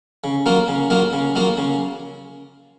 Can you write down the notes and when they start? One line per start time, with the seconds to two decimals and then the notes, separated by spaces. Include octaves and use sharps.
0.24 C#3
0.46 F#3 A#3 F4 A#4
0.68 C#3
0.90 F#3 A#3 F4 A#4
1.13 C#3
1.35 F#3 A#3 F4 A#4
1.57 C#3